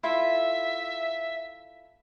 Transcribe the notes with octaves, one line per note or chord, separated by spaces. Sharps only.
E4 F4 A4 E5